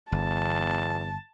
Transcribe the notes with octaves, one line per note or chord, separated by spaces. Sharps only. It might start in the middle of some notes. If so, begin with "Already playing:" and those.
G1 E2 A5